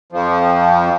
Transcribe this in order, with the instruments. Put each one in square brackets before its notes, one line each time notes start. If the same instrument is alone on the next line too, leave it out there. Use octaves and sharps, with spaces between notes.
[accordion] F2 F3